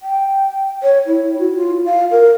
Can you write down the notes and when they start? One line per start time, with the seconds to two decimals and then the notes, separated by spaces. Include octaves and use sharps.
0.02 G5
0.83 C#5
1.07 E4
1.40 F#4
1.57 F4
1.86 F5
2.11 A#4